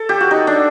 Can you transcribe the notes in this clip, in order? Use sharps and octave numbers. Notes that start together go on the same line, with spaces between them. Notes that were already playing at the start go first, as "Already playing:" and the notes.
Already playing: A4
G4
F#4
D#4
D4